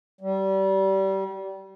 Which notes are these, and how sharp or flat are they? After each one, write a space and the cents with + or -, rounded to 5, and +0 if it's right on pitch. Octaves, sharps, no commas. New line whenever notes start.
G3 -25